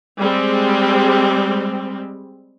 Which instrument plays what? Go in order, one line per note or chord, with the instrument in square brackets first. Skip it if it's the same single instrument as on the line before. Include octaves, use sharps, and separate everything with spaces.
[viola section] G3 G#3 C4